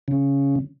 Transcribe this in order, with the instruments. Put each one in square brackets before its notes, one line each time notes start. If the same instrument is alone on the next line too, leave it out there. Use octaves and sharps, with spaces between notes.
[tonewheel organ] C#3